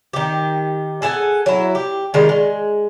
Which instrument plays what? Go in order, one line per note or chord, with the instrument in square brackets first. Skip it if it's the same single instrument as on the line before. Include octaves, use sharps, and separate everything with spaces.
[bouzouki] D#3 G4
G#4 A4 F#5 G#5
F#3 E4
G4
D#3 G3 G#3 F4
G#3